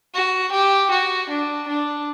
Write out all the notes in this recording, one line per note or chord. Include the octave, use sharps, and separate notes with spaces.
F#4
G4
F#4
D4
D4